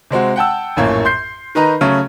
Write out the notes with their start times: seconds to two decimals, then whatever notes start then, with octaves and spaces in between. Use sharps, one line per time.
0.11 C3 G#3 C4 F#4
0.36 F#5 G5 A5 E6
0.76 A#1 F#2 A2 A#3 C#5
1.05 C6 G6 C7
1.55 D#3 B4 D#5 A#5
1.81 C#3 F#3 A3 C#4